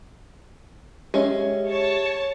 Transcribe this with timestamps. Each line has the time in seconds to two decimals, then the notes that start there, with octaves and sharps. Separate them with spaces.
1.14 G#3 C#4 G4 E5
1.67 C#5 A5